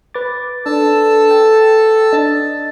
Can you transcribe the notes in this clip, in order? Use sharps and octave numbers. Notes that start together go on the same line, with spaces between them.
B4 D6 A6
D4 A4 A5 E6
G5
D4 D#5 A6